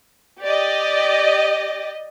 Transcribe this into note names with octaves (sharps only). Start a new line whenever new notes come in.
G4 D5 D#5